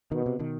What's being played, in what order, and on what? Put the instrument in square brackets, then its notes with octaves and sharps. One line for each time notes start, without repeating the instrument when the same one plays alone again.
[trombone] B2 [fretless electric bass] D#3
[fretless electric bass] C3
B2 D#3